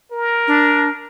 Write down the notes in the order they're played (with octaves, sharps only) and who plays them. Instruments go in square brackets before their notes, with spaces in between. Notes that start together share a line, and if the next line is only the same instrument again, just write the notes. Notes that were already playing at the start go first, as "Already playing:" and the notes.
[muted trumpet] A#4
[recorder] D4